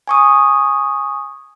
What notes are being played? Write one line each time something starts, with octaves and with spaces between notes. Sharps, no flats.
G#5 C#6 D#6